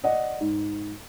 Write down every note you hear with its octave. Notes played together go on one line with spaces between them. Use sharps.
D5 D#5 F#5
G#2